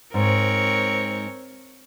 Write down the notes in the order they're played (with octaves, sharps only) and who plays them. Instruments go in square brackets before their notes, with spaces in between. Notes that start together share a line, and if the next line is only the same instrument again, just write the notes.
[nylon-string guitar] G#2 [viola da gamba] C4 A#4 C#5